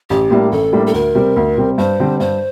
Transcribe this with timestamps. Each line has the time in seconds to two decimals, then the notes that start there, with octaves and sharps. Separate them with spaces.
0.10 A1 G4
0.31 A2 G3 A#3 D4
0.52 A1 A4
0.73 A2 G3 A#3 D4
0.87 A4
0.93 D2 A#4
1.15 C3 G3 C4
1.36 D2
1.57 C3 G3 C4
1.78 G2 C5
2.00 D3 G3 C4
2.20 G2 C5